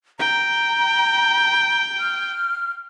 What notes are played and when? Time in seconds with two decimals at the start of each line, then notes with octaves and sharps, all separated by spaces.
0.20 G5 A#5
2.00 F6